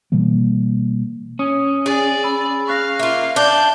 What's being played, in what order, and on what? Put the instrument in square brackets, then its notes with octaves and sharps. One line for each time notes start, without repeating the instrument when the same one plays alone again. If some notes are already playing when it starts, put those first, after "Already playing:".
[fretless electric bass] B2 E3 G3 A#3
[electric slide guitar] C#4 [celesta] D#6
[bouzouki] G#4 [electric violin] D5
[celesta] B5 E6
[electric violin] F5 [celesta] C#6 F#6 A#6
[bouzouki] A#3 F4 [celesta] E5
[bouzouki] D4 [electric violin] G6